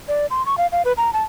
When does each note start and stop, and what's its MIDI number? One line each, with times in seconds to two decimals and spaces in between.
0.08 0.26 74
0.30 0.45 84
0.46 0.55 85
0.58 0.67 77
0.72 0.82 77
0.85 0.92 71
0.97 1.13 82
1.13 1.23 81